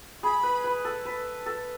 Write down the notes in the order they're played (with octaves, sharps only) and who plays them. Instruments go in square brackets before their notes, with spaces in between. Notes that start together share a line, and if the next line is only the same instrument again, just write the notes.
[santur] G#4 [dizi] B5
[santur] B4
B4
A4
B4
A4